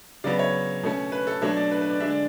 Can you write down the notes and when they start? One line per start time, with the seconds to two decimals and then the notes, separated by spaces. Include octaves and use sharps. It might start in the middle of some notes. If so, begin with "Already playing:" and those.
0.24 C#3 F#3 B3 D5
0.39 C#5
0.83 B2 A3 C#4
1.12 B4
1.27 A4
1.42 B2 F#3 A3 D4 C#5
1.56 D5
1.71 B4
1.81 B4
1.90 D5
2.00 D3 G#3 D4 E5
2.10 D5